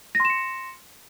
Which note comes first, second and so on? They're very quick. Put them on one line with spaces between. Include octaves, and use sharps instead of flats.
A#6 C6 E7 C#7